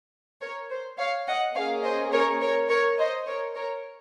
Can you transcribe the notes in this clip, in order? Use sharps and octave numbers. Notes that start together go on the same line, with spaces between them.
A#4 C#5
C5
C#5 F5
D#5 F#5
A#3 C#4 G#4 C#5 F5
C5 D#5
A#4 C#5
A#4 C#5
A#4 C#5
C5 D#5
A#4 C#5
A#4 C#5